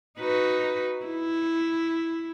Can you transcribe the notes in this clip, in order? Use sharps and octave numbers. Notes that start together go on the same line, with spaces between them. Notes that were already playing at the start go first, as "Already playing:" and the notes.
D#4 F#4 B4
E4